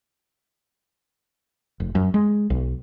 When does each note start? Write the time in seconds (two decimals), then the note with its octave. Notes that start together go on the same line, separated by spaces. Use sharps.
1.80 F1
1.95 F#2
2.14 G#3
2.50 B1